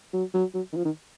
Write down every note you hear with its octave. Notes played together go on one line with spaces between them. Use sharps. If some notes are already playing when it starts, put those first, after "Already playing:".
F#3
F#3
F#3
D#3
F3
D#3